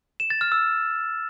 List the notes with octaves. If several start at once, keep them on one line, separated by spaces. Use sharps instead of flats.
E7
A6
F6
E6